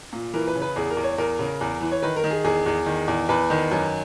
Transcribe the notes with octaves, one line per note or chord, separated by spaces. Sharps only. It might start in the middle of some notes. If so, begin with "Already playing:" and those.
A#2
E3 A#4
B4
C#3
B4
E2 G#4
A#4
E2
C#5
E2 A#4
C#3
E2
E3
C#5
D#3 B4
A#4
D#3
G#4
E2 G#4
E2
D#3
E2
E2 B4
D#3
F#2